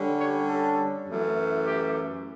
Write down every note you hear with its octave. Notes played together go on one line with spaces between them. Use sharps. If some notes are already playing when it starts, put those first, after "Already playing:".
Already playing: D3 G3 C#4
C#5
A4
F#2 E3 A3
G4